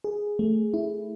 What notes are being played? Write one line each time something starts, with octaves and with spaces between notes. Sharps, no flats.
G#4
A3
E4